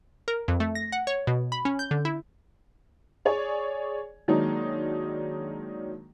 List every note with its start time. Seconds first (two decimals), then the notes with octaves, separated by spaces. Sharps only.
0.28 A#4
0.48 F2
0.60 A3
0.75 A#6
0.92 F#5
1.07 C#5
1.27 B2
1.52 B5
1.65 C#4
1.79 G6
1.91 D3
2.05 E4
3.25 G#4 C#5 D5 G#5
4.28 D#3 F#3 G#3 A#3 D4 D#4